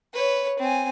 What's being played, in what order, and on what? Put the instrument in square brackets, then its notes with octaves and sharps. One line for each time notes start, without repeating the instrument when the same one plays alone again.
[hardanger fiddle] B4 C#5
C4 G#5